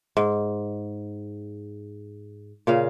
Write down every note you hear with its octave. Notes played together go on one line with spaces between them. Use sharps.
G#2
A#2 C#3 F5